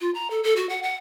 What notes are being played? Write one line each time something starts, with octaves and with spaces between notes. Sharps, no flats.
F4
A#5
A4
A4
F#4
F#5
F#5